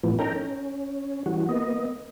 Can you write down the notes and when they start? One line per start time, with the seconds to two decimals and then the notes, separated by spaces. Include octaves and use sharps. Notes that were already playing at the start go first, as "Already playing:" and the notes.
0.03 A2 E3 F3 B3
0.19 C#4 D#4 A4 A#4 G5 A#5
0.36 C#4
1.26 E3 G3 F#4
1.49 A#3 B3 D#5